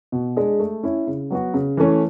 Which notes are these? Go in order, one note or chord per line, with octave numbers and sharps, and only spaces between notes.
B2
G#3 D4 G#4
A3
C#4 E4
C#3
F#3 B3 F#4
C#3
E3 A3 C#4